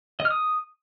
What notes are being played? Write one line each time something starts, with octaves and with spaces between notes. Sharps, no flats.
D#5
F6
D#6